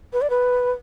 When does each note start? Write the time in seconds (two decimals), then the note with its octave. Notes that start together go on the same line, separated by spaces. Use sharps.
0.13 B4
0.22 D5
0.30 B4